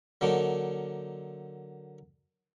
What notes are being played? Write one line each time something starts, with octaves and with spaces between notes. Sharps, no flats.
D3 F#3 A#3 D4 D#4